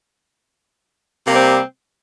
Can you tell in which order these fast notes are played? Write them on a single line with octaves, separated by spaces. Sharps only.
C3 A#3 G3 C4